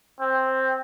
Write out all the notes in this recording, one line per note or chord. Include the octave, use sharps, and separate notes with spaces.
C4